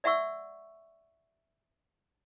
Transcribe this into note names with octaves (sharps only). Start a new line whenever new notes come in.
D5 E5 F#5 C#6 E6